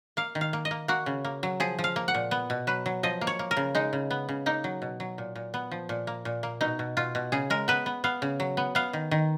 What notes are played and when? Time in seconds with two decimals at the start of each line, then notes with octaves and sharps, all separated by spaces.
0.17 A#3 F5
0.35 D#3
0.41 F5
0.53 A#3
0.65 D#5
0.71 A#3
0.88 A#3 F#4
1.06 C#3
1.25 A#3
1.43 F#3
1.60 F3 G#4
1.79 F3
1.84 F5
1.96 A#3
2.08 F#5
2.14 A#2
2.31 B3
2.50 B2
2.67 F#3 B4
2.86 F#3
3.03 F3 D#5
3.21 A#3
3.27 C#5
3.39 A#3
3.51 A#4
3.57 C#3
3.75 G#3 D#4
3.93 C#3
4.11 B3
4.29 C#3
4.46 A#3 D#4
4.64 F#3
4.82 B2
5.00 F#3
5.18 A#2
5.35 A#2
5.54 B3
5.71 F3
5.89 A#2
6.07 A#3
6.25 A#2
6.43 A#3
6.61 B2 D#4
6.79 B2
6.97 B2 F4
7.15 B2
7.32 C#3 G#4
7.50 G#3 A#4
7.68 B3 B4
7.86 B3
8.04 B3 F5
8.22 C#3
8.40 F#3
8.57 B3
8.75 B3 F5
8.93 D#3
9.11 D#3